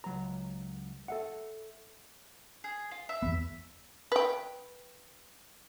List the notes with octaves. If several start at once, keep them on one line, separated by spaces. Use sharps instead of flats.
C#2 F#3 A#5
A4 E5 F#5
G#4
F4
E5
E2 G2 B3
B4 G5